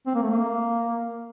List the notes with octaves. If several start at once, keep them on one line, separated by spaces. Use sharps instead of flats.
C4
A#3
A3
A#3